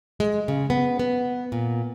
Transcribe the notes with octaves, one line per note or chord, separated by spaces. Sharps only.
G#3
C#3
B3
B3
A#2